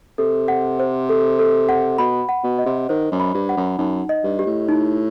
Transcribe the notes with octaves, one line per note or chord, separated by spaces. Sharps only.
C3 A4
F#5
C5
A4
A4
F#5
B2 B5
F#5
B2
D#5
C3
D#3 C5
F#2
B5
G2
F#5
F#2
F#2 D#4
D#5
G2
G4
A2
D#4